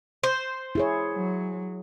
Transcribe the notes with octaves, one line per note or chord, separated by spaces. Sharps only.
C5
E4 G#4 C#5
F#3